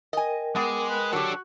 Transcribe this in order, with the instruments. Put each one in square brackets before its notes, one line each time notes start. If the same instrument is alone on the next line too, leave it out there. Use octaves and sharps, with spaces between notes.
[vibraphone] A#4 G5 [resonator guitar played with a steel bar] D#5 G#5
[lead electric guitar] G#3 G#4 [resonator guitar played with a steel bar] B3 [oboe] D6
[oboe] B4
[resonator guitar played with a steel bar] F#3 G4 [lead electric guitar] D4 A4 [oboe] F#4